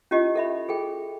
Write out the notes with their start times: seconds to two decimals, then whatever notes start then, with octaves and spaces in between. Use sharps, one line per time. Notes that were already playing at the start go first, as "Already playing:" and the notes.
0.11 C#4 E4 F4 G4 D#5
0.35 A4 E5 B5
0.69 G#4 A4 G5